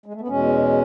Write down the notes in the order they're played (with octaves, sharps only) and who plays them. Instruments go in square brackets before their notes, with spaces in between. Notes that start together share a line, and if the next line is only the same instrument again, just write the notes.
[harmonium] G#3
A3
B3
E2 B2 G#3 C#4